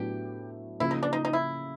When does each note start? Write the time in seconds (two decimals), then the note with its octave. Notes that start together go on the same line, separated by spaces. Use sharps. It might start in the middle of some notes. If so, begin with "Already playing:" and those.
Already playing: A2 F#3 B3 D4 G4
0.80 C#3 F3 A#3 E4
0.91 D#4
1.03 D4
1.13 D#4
1.25 D#4
1.33 E4